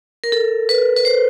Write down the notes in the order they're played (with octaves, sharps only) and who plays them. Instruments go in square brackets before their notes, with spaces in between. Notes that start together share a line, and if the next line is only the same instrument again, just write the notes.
[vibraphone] A#4
A4
B4
B4
C5